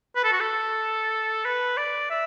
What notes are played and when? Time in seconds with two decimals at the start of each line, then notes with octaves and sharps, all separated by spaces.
0.16 B4
0.24 A4
0.32 F#4
0.40 A4
1.45 B4
1.77 D5
2.10 E5